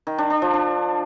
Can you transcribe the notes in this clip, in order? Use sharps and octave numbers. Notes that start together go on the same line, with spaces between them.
D#3
D4
D4
F3
D4